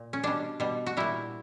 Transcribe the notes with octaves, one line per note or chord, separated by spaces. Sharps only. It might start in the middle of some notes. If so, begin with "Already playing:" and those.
Already playing: A#2
C#4
B2 G3 D4
B2 G3
F#4
A#2 G3 E4